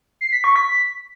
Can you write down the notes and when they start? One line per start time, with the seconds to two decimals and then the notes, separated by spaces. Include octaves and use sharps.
0.21 C7
0.32 B6
0.44 C#6
0.56 B6